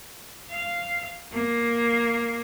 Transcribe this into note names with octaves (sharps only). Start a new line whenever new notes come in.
F5
A#3